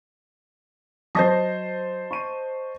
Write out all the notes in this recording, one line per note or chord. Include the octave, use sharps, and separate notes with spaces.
F#3 C5 D#5 A5 D#6 A#6
C#6 D#7